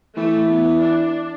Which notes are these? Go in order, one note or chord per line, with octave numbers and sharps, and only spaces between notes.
E3 A3
B3
D4